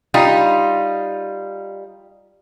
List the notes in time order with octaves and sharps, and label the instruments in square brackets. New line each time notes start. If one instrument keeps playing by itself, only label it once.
[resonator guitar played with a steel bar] G3 D#4 F4